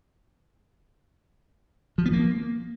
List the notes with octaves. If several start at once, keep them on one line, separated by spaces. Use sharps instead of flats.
F3
B3
A#3